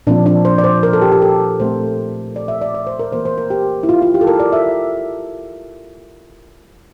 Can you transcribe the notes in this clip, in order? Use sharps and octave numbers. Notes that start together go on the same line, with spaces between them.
A#2 F3 C4 D4
D4
C5
D5
C5
A#4
A4
G4
G4
A4
A#2 A3 C4 C5
D5
E5
D5
D5
C5
A#4
E3 A#3 C5
C5
A#4
G4
E4
F4
F4
G4
A4
A#4
D5
E5